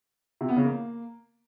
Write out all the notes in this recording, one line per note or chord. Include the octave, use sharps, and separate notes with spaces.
C3
B3
C#3
A#3